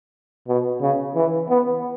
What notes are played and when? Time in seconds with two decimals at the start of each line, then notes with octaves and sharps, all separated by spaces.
0.48 B2
0.81 C#3
1.15 E3
1.49 B3